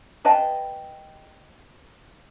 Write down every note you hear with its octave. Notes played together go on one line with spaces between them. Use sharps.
G#4 B4 D#5 G5 A5